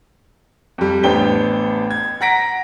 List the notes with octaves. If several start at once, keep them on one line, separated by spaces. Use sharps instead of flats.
F2 G3
A1 B3 D4 C5 G5 G7
G#6
F#5 A#5 A#6 B6 D7